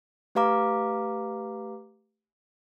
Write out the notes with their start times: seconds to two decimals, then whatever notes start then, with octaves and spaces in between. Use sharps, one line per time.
0.35 A3 G4 B4 F5 A#5 D6